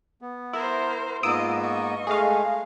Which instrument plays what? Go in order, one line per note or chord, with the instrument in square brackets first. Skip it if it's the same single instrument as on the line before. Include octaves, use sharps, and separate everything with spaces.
[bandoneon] B3
[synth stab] E4 [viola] A#4 C5
[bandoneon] G#2 A#3 B3 [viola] F4 D#5 [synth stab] D#6 E6 D7
[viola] D#5 C#6
[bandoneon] G#3 A3 [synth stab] G#4 F5